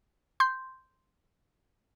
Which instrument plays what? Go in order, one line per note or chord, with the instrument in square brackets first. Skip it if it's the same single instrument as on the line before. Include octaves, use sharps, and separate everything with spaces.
[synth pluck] C6 G6